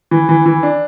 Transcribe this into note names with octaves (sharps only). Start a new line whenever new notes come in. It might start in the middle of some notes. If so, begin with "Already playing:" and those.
E3
E3
E3
D4